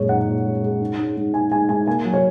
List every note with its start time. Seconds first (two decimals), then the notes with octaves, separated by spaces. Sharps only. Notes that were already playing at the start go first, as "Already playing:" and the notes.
Already playing: F#2 A#2 G#3 C#5
0.09 D#4 F#5
0.27 A#2
0.45 G#3
0.63 G#3
0.81 G#2
0.98 G#2
1.17 G#2
1.34 G#2 G#5
1.51 G#2 G#5
1.69 G#2 G#5
1.87 A#3 G#5
2.05 F#3
2.14 C#5